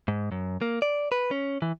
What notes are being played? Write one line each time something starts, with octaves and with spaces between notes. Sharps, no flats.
G#2
F#2
A#3
D5
B4
C#4
E3